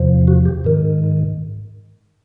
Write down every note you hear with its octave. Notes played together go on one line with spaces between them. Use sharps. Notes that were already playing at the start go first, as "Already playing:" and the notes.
Already playing: E2 C3 F3
F#4
G4
G#2 D#3